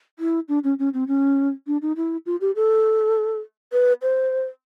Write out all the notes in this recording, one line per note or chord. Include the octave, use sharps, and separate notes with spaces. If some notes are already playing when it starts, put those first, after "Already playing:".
E4
D4
C#4
C#4
C4
C#4
D4
D#4
E4
F4
G4
A4
B4
C5